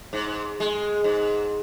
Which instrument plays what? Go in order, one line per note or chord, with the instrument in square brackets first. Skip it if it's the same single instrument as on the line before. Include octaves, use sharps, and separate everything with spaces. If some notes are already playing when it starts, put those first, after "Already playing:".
[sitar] G#2
G#3
G#2